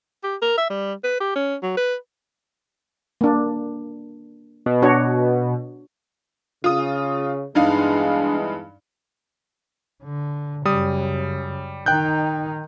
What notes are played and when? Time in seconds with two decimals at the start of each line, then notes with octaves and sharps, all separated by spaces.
0.24 G4
0.42 A#4
0.58 E5
0.70 G3
1.04 B4
1.21 G4
1.36 C#4
1.63 F#3
1.77 B4
3.21 A#3 D4
4.66 B2
4.82 D4 F#4 C#5
6.64 C#3 F4 D#6
7.55 E2 G2 E3 G#3 D4 D#4 F5
10.03 D3
10.65 F#2 C#3 G3 D#6
11.86 D#3 D#4 G5 F#6 G6